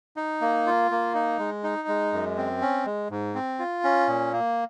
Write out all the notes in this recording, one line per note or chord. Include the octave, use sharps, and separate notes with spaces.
D#4
A#3
F4
A#3
D#4
G#3
D#4
G#3
F#2
C4
C#4
G#3
G#2
C4
F4
C#4
A#2
A#3